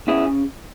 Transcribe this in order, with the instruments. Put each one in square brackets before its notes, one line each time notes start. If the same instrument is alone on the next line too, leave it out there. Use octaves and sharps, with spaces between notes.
[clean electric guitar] C#3 E4 G#4